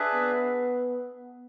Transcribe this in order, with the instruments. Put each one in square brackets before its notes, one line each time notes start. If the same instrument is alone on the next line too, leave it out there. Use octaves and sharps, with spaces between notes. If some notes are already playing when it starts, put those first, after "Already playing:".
Already playing: [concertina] D4 G#4 B4 E5
[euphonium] B3